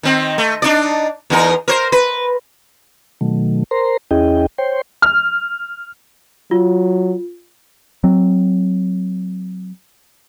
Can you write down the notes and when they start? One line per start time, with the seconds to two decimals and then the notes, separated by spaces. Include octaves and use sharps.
0.03 D#3 C4
0.38 A3
0.62 D4 D#4 D5
1.30 E2 D#4 A#4
1.68 A#4 C5
1.92 B4
3.21 B2 D#3 F#3 A3
3.71 A#4 C5 A#5 C6
4.11 E2 C#4 E4 G#4 D#5 G5
4.58 C5 C#5 G5 C6
5.02 F6
6.51 F#3 F4
8.04 F#3 C4